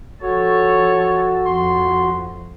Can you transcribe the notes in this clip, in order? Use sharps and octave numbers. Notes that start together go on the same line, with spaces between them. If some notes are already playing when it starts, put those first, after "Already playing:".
F3 F#4 A4 C#5
F2 C6